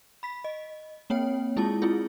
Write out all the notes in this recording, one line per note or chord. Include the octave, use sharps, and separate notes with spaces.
B5 B6
D#5
A#3 C4 C#5 G5
G#3 E4 F4 G#4 A5
C4 E4 F4 G#4